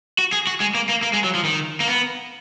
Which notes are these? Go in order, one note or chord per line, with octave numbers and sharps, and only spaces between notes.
F#4
G#4
F#4
G#3
A#3
A#3
A#3
G#3
F#3
F3
D#3
A#3
B3